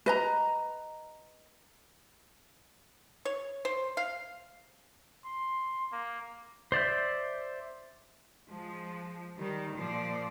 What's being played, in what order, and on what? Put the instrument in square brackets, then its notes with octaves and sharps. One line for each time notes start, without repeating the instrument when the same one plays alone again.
[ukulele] B4 D#5 A#5
[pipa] C#5
C5
F5
[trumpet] C6
A#3
[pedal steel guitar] C5 D5 E5 G6
[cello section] F3 G#3
D#3 G3
A#2 F3 C5 D5